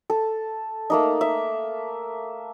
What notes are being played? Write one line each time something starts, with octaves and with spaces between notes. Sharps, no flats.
A4
A3 A#3 D#4
E5